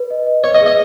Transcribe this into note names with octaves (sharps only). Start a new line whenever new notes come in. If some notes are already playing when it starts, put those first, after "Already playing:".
Already playing: B4
D#5
D#5
B4 C#5
D#5
G#4
D#5